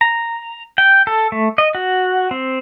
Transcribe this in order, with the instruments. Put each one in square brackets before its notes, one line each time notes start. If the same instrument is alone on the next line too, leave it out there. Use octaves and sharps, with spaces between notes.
[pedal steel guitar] A#5
G5
A4
A3
D#5
F#4
C4